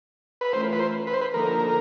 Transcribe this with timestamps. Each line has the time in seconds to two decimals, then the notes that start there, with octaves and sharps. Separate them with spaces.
0.41 B4
0.52 E3 A3 C#4 F4 A#4 C5
0.73 B4
0.79 C5
1.07 B4
1.13 C5
1.21 B4
1.33 D3 F3 A#3 D#4 A#4